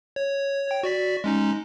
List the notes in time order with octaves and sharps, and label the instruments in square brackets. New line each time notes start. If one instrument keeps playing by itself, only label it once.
[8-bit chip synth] C#5
C#5 G5
F#4 D5 B6
G#3 C#4 D#4